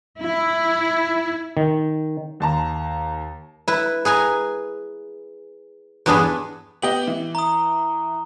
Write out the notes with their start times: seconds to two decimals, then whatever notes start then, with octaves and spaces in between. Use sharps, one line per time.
0.22 E4
1.57 D#3
2.40 D#2 A5 A#5
3.68 E4 B4
4.05 G#4 B4 G#5 A#5
6.06 E2 G2 B3 D4 G#4 B5
6.82 B3 G4 D#5 F#7 G7
7.07 E3
7.35 A#5 D#6